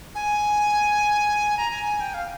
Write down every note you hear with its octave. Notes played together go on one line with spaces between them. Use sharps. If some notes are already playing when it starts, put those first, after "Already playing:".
G#5
A#5
G#5
G#5
G5
F5